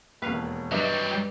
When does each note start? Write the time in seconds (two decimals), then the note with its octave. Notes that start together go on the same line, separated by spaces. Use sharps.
0.22 E1 D#2 B4 F5 B5
0.72 G2 F#3 G3 D#5 E5